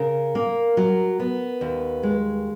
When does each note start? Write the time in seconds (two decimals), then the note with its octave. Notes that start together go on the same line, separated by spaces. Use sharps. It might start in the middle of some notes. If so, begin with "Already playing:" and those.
Already playing: C#3 A#4
0.35 A#3
0.77 F#3
1.19 B3
1.61 D#2
2.03 G#3